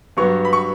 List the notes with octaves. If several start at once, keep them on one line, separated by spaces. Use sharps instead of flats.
G2 F#3 B3 C#6
B5
C#6